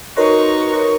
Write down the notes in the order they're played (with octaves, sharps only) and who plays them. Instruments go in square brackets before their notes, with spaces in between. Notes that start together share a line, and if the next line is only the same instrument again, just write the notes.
[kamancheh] D#4 C#6 [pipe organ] F#4 B4 D#5 [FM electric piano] A#4 C#5 C6